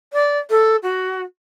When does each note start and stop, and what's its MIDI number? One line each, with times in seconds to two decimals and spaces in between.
0.13 0.38 74
0.50 0.76 69
0.82 1.21 66